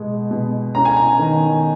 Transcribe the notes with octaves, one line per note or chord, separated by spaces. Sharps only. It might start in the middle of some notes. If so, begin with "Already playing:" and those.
Already playing: B2 G#3
B2
C#4 A#5
G#5
A#5
D#3